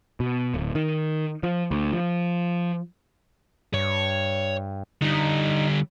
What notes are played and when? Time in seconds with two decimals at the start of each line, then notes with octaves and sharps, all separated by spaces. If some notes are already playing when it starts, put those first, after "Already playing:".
0.20 B2
0.54 D1
0.75 D#3
1.43 F3
1.71 D2
1.93 F3
3.74 G2 C#5
5.02 D3 G3 D#4